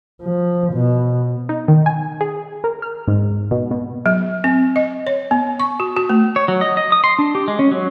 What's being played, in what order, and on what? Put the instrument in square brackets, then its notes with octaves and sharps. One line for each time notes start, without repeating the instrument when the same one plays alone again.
[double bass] F3
B2
[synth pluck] D#4
D#3
G#5
G#4
A#4
F6
G#2
B2
B2
[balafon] F#3
C4
D#5
C#5
B3
C#6
F#4
F#4
A3
[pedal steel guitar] C#5
F#3
D#5
D#5
D#6
C6
D4
G4
G#3
C#4
F#3